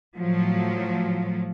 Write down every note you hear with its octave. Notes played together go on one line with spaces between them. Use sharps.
A2 F3 F#3